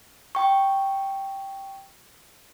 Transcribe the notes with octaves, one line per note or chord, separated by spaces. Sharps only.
G5 C#6